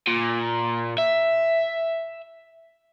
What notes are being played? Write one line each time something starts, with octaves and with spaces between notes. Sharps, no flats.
A#2
E5